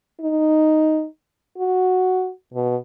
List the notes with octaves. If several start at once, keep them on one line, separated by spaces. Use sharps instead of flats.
D#4
F#4
B2